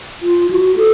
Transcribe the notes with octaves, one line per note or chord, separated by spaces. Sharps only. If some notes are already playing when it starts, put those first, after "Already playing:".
F4
F#4
A4